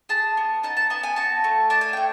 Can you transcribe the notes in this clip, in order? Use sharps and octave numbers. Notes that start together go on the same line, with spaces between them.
G#4 A5
B3
D#4 A5
A5
B3 A5
G#5
F#4 A5
A3
D4 A5
G#5
A3 G5